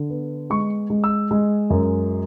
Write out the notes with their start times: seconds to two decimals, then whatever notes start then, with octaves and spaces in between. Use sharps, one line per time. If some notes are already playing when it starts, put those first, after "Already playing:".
Already playing: D3
0.10 B3
0.50 G#3 C#6
0.90 G#3
1.04 E6
1.31 G#3
1.70 F#2